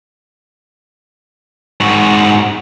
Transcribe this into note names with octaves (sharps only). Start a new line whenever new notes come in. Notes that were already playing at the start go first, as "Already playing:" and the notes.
G#2 F#4